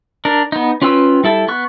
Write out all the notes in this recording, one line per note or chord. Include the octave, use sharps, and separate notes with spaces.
D4 A#4
B3 D#4
C#4 F4 B4 G5 E6
G3 E4 A4
B3 C#6 F#6